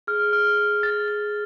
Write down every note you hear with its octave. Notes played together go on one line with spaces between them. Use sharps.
G#4 F6
F6
F6
A6
A6